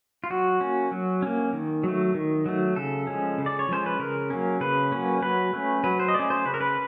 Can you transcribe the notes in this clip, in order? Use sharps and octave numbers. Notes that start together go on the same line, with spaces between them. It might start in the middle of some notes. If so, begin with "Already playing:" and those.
F4
F#3 F#4
A#3 C#4
F#3
A#3 C#4
D#3
F#3 A3
D#3
F#3 A3
C#3 A4
F3 G#3 C#4
C#3
D5
C#5
F3 G#3 C#4 C5
B4
C#3 A#4
F#3 A#3 C#4
C#3 B4
F#3 A#3 C#4
F#3 B4
A3 C#4
F#3 B4
C5
D#5
A3 C#4 D5
C5
C#3 B4
A#4
B4